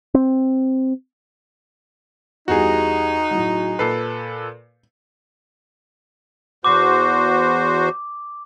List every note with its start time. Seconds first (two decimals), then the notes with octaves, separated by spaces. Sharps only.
0.14 C4
2.48 E2 G3 D#4 F#4 G#4
3.31 A2 F#3
3.79 A#2 A4 B4 C7
6.65 E2 F#4 C5 D6